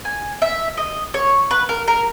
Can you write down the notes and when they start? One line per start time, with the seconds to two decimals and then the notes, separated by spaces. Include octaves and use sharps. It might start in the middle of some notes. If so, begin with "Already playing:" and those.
0.05 G#5
0.42 E5
0.78 D#5
1.14 C#5
1.51 B4
1.69 A#4
1.88 A#4